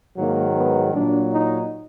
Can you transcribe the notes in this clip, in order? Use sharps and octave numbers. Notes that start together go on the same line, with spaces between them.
G#2 D#3 F#3 A#3
B3
A#2 F#3 D4
D#4